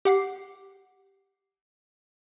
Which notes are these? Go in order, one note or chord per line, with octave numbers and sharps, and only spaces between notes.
G4 F#5 D6 C7